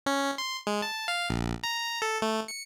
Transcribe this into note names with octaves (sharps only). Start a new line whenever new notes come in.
C#4
C6
G#3
A5
F5
A#1
A#5
A4
A3
C#7